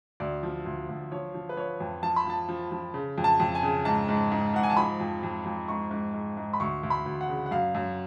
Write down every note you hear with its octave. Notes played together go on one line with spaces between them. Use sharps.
D2 D5
F3
D2
D2
F3 C#5
F3
B4
F3 C#5
F2
F3 A5
B5
F3 A5
F3
F3
C#3
F2
A5
F2
G#5
C#3
G#2 A5
G#2
G#2
G#2 F#5
G#5
A5
F3 B5
F2
F2
F2
G#2 C#6
G#2
G#2
G#2
B5
D2 C#6
D2
B5
D2
F#5
C#3
F#5
F#2 F5
F#2